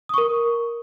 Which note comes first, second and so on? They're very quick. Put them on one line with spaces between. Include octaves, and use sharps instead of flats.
D#6 C#6 A#4